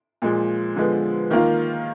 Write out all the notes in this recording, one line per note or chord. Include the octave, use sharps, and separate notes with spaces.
A#2 F3 G#3
D3 F3 G#3 B3
D#3 A#3 F4